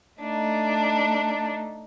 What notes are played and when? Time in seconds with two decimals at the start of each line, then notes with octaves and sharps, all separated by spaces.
0.19 A3 D4 D#4